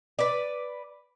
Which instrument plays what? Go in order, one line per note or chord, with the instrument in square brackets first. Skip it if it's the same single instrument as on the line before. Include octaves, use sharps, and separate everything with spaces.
[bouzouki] B4 D5